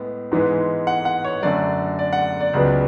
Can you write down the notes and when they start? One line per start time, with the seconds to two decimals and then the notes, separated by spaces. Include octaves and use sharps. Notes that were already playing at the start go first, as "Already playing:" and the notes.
Already playing: A2 G#3 B3
0.32 G#2 E3 G#3 B3
0.87 F#5
1.05 F#5
1.24 C#5
1.43 F#2 D3 A3 D5
1.99 D5
2.13 F#5
2.40 D5
2.53 C#2 C#3 F#3 B3 D5